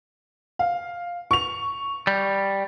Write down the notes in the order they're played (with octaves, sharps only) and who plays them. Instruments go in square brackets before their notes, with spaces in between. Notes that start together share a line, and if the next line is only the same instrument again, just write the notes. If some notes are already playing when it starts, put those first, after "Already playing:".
[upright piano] F5
C#6 F7
[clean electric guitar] G3